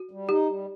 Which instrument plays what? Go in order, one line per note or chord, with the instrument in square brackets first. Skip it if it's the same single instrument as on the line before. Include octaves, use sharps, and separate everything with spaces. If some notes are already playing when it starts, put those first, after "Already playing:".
Already playing: [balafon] F#4
[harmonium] G3
[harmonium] D#4 [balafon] G4
[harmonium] G3